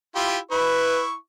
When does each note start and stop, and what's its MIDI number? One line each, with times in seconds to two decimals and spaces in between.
0.16 0.37 64
0.16 0.37 65
0.16 0.37 67
0.51 1.14 64
0.51 1.02 71
0.51 1.14 85